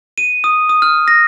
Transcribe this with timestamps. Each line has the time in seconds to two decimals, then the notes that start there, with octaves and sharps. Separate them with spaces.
0.18 D#7
0.44 D#6
0.69 D#6
0.82 F6
1.08 A#6